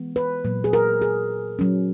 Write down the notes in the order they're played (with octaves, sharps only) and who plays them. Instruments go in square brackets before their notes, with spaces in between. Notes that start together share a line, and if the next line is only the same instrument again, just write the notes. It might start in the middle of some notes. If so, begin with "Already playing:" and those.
Already playing: [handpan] E3 G#3 B3
B4
A#2 F#3 A#3
G#4
A#4
G#4
A#2 F#3 C#4